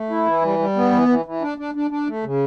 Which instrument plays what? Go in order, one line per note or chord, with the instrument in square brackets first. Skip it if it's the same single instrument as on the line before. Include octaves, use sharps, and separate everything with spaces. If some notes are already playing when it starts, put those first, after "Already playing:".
Already playing: [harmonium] A3
E4
E3
G3
G3
B3
E3
E3
E3
D4
D4
D4
D4
A3
C#3